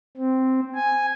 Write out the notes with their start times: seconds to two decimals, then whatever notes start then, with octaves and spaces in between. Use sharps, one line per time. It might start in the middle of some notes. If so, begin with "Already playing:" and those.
0.17 C4
0.75 G#5